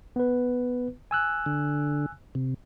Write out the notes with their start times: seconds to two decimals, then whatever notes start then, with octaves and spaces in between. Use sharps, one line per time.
0.16 B3 B4
1.11 G#5 E6 F#6
1.46 D3
2.35 C3